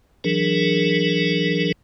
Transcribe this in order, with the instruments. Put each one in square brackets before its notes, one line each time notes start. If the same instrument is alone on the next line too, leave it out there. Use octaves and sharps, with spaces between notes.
[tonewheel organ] E3 F#3 D4 G#4 A#4